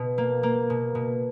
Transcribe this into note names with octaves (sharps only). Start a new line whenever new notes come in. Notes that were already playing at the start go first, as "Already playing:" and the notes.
Already playing: B2
A#3
A#3
B2
B2